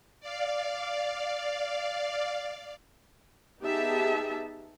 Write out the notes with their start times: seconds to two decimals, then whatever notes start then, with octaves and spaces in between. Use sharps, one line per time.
0.20 D5 F5
3.61 B3 D#4 G4 G#4 E5 A5